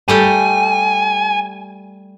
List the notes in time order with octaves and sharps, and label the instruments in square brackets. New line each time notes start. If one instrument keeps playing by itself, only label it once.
[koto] G3 A3 G4 [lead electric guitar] G#5